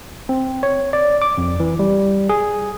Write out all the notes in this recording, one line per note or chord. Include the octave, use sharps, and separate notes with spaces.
C4
C#5
D5
D6
F2
E3
G3
G#4